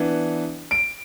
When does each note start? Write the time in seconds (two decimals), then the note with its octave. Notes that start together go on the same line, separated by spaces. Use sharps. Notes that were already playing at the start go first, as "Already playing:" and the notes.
Already playing: E3 B3 D4
0.71 D7